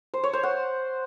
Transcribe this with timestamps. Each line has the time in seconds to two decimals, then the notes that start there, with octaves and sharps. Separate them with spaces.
0.14 C5
0.23 C#5
0.33 C5
0.43 F#5